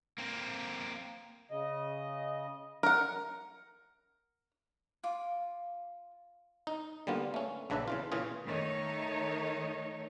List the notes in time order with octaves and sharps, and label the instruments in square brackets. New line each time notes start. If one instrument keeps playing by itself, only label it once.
[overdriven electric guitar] A#3 C4
[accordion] C#3 D#5
[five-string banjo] A#4 F#5
[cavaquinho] F4 D6
[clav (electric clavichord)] D#4
D3 G3 A#3 B3 F4
A3 C#4
A#1 C#3 D4 B4 E5
C#3 E3 F4
A#2 C#3 E3 C#4 F4 G#4
[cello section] D#3 A3 D#4 C#5